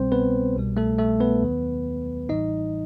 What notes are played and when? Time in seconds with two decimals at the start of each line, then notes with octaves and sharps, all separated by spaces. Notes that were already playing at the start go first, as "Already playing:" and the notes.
Already playing: C2 B2 G3 C4 C5
0.12 B3 B4
0.56 C2 B2 G3
0.77 A3 A4
0.98 A3 A4
1.20 B3 B4
1.42 D#2 D#3 F#3
2.29 A1 A2 E3 G3 D#4 D#5